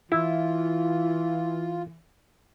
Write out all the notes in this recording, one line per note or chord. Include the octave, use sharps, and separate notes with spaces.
E3 E4 F4